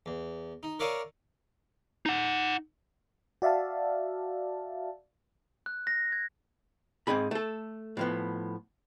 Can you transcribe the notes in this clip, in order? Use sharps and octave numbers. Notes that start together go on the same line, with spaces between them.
E2
D#4
A#4 C#5 D5 E5 F5 D#6
D#4 F#5
F#4 D5 E5 F5 A5
F#6
A#6
G#6
G#2 C4 D#4 G#4 B5
A3 A4
A2 F3 B3